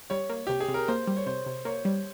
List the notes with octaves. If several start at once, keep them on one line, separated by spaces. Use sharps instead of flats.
G3 C#5
A#3
C3 G4
G#4
C3
A#4
A#3 C5
G3
C#5
C3 C5
C3
A#3 C#5
G3